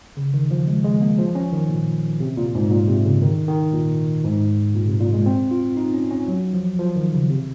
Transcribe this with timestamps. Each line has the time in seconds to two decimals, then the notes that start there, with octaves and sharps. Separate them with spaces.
0.17 C#3
0.34 D#3
0.51 F3
0.67 G#3
0.84 G#3
1.01 A#3
1.18 F3
1.35 C#4
1.53 D#3
1.69 A#2
2.20 C3
2.37 A#2
2.55 G#2
2.71 A#2
2.88 C3
3.05 C#3
3.22 D#3
3.48 D#3
3.73 A#2
4.24 G#2
4.75 A#2
4.88 C3
5.00 A#2
5.13 G#3
5.26 C4
5.51 F4
5.77 D#4
5.94 C#4
6.11 C#4
6.28 F#3
6.53 F3
6.79 F3
6.96 D#3
7.13 C#3
7.30 C3